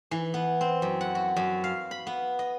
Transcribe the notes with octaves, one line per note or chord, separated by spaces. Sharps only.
E3
B3
C4
F#2
F#5
F#4
F#2
F5
B5
B3
D#5